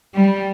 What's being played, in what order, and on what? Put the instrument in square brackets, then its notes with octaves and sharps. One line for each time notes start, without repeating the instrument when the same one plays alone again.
[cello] G3